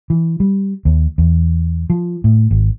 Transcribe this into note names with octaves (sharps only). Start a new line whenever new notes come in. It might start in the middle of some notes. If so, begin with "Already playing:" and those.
E3
G3
D#2
E2
F3
A2
G#1